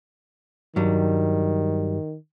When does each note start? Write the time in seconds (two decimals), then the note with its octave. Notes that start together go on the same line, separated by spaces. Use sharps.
0.76 G2 D#3 F#3 G3